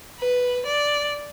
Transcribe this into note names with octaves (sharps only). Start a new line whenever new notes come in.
B4
D5